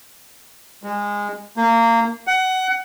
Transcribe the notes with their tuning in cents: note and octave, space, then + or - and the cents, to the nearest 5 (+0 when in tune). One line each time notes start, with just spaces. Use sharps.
G#3 -20
A#3 -20
F#5 +20